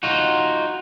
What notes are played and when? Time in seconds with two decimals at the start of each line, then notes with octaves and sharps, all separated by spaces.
0.03 D#4 F4 F#4